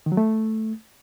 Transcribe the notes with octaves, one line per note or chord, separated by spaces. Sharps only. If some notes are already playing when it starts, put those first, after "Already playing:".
D#3
F#3
A3